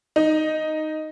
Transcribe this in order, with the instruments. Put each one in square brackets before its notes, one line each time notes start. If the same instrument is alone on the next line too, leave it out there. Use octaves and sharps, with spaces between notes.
[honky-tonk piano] D#4